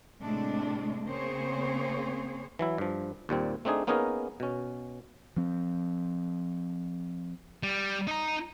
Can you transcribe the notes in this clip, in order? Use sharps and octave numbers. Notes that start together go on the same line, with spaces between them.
A2 C3 G#3 A3 D4
C#3 A#3 C4 G#4 C5 C#5
E3 F#3 E4
G2 F3
D#2 A#2 G3 C4
A3 C4 D4 D#4 G#4
A#3 B3 C#4 D#4 G#4 A#4
B2 C#4
F3 C4
G3
D#4 A#5